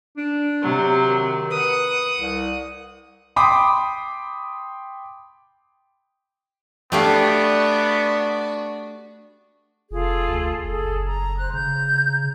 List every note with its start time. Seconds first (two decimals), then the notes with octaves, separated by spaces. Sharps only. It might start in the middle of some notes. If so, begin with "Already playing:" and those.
0.17 D4
0.62 C3 F#3
1.05 D#3
1.51 B4 F#5 D#6
2.19 C2
3.36 G5 B5 C6 D6 D#6
6.92 A3 B3 D4 F#4 G4 F5
9.91 F1 F4 G#4 A4
10.28 D2
10.64 F#1 G#4 A4
11.05 A#5
11.38 C5 F#6
11.53 C#3 A#5 G6